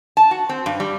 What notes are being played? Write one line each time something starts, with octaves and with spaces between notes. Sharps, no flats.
A5
F#4
C4
G2
G3